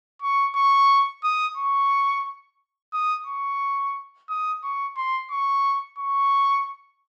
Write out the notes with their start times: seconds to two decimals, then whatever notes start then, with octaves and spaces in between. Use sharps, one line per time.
0.22 C#6
0.55 C#6
1.24 D#6
1.57 C#6
2.94 D#6
3.27 C#6
4.29 D#6
4.64 C#6
4.97 C6
5.31 C#6
5.99 C#6